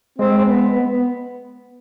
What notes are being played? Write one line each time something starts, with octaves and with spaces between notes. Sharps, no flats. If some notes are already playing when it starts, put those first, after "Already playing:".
G#3 C4
C4
B3
B3
B3